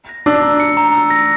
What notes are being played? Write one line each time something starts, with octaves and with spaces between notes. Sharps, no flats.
A#6
D4 E6
A#5
C#7
A#5
E6
A#6